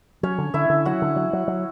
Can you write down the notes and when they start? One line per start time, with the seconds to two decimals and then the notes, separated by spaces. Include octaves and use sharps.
0.23 F#3 C#4 C#5
0.38 D3
0.54 D3 E4 E5
0.70 D3
0.85 F#3 F#4 F#5
1.02 D3
1.16 F#3
1.33 F#3
1.48 F#3